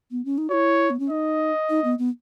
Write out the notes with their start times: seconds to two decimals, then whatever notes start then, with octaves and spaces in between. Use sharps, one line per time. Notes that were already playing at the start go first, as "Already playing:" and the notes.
0.11 B3
0.25 C#4
0.38 D#4
0.50 E4 F#4 C#5
0.90 B3
1.00 C#4
1.10 D#4 D#5
1.70 D#4
1.84 B3
1.99 B3